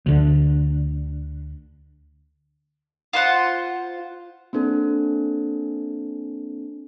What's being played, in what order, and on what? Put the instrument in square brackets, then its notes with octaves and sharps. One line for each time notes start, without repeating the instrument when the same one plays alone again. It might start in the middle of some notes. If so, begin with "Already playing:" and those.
[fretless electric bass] D2 D3
[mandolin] F4 C5 F#5
[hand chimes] A#3 C4 D4 A4